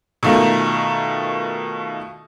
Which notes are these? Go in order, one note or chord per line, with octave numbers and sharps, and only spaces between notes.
B2 D#3 A3 F4 A#4